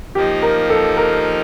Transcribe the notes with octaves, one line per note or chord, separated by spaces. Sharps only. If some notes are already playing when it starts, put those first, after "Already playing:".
F3 A#3 D#4 G4
A#4
A4
A#4